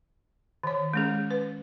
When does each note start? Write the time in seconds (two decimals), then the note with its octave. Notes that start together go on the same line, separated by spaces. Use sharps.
0.63 D#3 C#5
0.93 G#3 C#4 G#4
1.31 B4